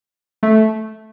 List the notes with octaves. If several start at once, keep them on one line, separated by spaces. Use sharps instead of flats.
A3